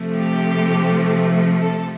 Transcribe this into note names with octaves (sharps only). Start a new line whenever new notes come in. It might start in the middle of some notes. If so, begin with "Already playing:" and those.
Already playing: C3 F3 A3
G4
A4